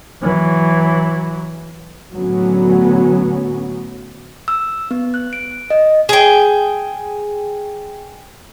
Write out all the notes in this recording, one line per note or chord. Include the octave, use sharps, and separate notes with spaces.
E3 F#3
A2 D3 F#3 B3 C#4
E6
B3
F#6
D7
D#5
G#4 G5